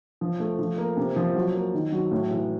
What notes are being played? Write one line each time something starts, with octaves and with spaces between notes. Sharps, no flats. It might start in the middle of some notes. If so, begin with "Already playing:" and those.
F3
A3
F3
A#3
C3
F3
F#3
A#3
D#3
F#3
A2
E3